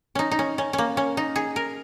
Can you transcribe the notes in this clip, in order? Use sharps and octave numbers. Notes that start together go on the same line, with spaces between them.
C#4 D#4
D#4
C#4
C#4
C#4
A#3
C#4
D#4
G#4
A#4